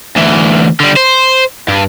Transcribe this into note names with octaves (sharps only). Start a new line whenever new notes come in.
D2 E3
D3 G3
C5
G2